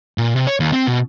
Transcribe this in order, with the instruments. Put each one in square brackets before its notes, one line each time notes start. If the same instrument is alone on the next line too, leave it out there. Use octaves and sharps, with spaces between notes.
[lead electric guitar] A#2
C3
C#5
D#2
C4
B2